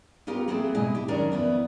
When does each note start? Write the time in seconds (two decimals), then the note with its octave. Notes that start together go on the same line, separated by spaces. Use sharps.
0.27 B3 C#4 F4 G4 A#4
0.48 A#3 C4 E4 F#4 G#4 A4
0.75 B2 G#3 E4 D#5 G#5
0.95 E4 G4
1.08 F#2 D#3 C#4 D4 A#4
1.32 F2 B3 E4